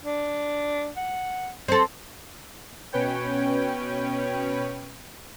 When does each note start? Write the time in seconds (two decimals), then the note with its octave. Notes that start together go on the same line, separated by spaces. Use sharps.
0.02 D4
0.97 F#5
1.68 C4 A4
2.92 B2 C#4 B4 C#5 G5